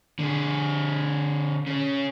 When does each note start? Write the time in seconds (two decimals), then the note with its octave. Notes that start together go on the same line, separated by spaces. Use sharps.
0.19 D3 G#4
1.66 C#3 C#4